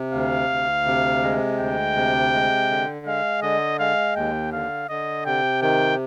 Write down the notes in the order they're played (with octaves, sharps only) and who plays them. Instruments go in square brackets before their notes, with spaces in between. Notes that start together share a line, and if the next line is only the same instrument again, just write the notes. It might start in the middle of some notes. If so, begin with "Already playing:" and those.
Already playing: [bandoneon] C3
[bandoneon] D2 [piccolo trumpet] F5
[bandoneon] D2
C3
G#3
[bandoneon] D2 [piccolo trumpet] G5
[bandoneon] C3
G#3
D3
[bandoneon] G#3 [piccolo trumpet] F5
[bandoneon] D3 [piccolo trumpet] D#5
[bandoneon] G#3 [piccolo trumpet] F5
[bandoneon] D#2 [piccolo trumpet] G5
[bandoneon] D3 [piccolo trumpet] F5
[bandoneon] D3 [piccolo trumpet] D#5
[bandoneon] C3 [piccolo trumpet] G5
[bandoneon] D#3 [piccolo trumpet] G5